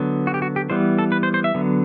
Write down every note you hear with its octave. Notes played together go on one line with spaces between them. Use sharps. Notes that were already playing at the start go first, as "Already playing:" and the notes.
Already playing: D3 F#3 B3
F#4
G4
F#4
G4
E3 G3 B3 C5
A4
B4
C5
C5
E5
D3 F#3 B3